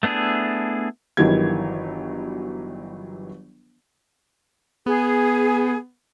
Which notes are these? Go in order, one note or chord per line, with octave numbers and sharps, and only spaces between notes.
A3 B3 D4 E4 G#4
G1 D#3 E3 F#3 G4 G#6
B3 G#4